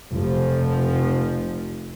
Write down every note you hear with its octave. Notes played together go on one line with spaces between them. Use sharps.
F1 F3